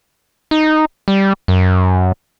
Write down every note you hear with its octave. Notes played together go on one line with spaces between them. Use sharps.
D#4
G3
F#2